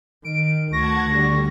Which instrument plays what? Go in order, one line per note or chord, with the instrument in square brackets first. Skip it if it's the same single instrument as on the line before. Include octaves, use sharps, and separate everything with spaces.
[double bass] D#3 [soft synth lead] D7
[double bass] D2 [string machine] F#5 A5 G#6 [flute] C#6 [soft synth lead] A#6
[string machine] D3 G3